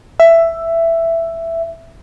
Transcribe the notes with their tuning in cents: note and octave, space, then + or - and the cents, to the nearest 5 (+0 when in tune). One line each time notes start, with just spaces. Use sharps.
E5 +10